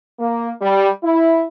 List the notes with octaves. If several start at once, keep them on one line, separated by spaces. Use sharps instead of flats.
A#3
G3
E4